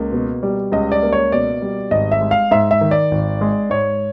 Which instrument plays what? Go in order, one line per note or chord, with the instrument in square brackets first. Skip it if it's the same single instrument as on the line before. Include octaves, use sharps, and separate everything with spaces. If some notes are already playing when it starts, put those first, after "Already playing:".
Already playing: [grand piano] C#2 A#3
B2
G3
C#2 D#5
D5
A#3
C#5
B2 D5
G3
G#1 D#5
E5
G#3
F5
G#2 E5
E5
D#3
D5
G#1
G#3
G#2 C#5